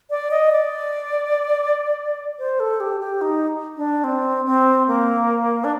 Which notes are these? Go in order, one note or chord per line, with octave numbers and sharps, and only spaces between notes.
D5
D#5
D5
C5
A4
G4
G4
D#4
D4
C4
C4
A#3
D4